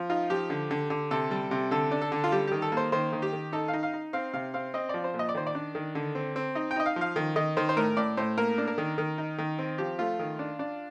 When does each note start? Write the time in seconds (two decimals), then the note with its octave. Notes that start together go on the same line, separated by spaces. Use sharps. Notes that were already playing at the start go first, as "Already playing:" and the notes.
Already playing: F3
0.10 D#4 F4
0.30 F3 G4
0.50 D3
0.71 D3
0.90 D3
1.11 C3 A4
1.31 G3
1.51 C3
1.71 D3 A4
1.91 D4
2.01 A4
2.12 D3
2.24 F4
2.32 G3 G4
2.47 D#3 G4
2.62 A4
2.72 A#3 C5
2.92 D#3 C5
3.13 D#3
3.22 G4
3.33 D#3
3.53 D#4 A4
3.68 F5
3.73 D#4
3.83 F5
3.93 D#4
4.13 C4 F5
4.33 C3 F5
4.54 C4 F5
4.74 C4 D#5
4.89 F3 D5
5.04 C5
5.14 A#2
5.19 D#5
5.29 D5
5.35 D#3 C5
5.47 D5
5.55 D4
5.75 D#3
5.95 D3
6.15 C4
6.36 C4
6.55 D#4 D#5
6.71 G5
6.76 D#4 D#5
6.86 F5
6.96 F3 F5
7.16 D#3
7.36 D#3 D#5
7.57 D#3 C5
7.69 C5
7.76 A2 A#4
7.97 A2 D5
8.17 A2 C5
8.38 A#3 A#4
8.58 D4
8.68 A#4
8.78 D#3
8.98 D#3
9.18 D#4
9.38 D#3
9.59 C4
9.78 F3 G4
9.99 A3 F4
10.19 D#3
10.39 D4
10.59 D4